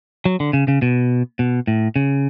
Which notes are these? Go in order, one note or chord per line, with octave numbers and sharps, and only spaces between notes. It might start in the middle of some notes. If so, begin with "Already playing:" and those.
F#3
D3
C#3
C#3
B2
B2
A2
C#3